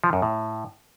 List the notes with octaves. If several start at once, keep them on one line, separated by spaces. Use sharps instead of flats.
F3
F#2
A2